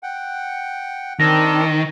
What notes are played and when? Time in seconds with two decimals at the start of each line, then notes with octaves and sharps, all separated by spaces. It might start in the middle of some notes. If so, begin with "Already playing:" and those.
0.03 F#5 G5
1.20 D#3 C4 D4 A#4 A#6